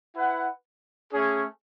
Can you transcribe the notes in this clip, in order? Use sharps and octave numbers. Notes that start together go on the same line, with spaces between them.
E4 B4 F#5
A3 C#4 G#4